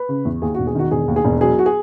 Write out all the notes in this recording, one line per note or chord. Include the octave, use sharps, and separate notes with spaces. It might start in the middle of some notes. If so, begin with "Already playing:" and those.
Already playing: B4
C#3
E2
D#2 G#4
F#4
E1
G#4
D#3 F#4
E1 G#4
D#2
G#4
E1
F#3 G#4
F#4
G#4